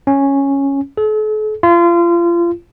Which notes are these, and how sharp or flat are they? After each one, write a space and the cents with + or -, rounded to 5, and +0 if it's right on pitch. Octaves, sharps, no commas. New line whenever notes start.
C#4 -5
A4 -45
F4 -30